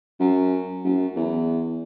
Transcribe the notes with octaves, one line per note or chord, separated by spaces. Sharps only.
F#2
F#2
E2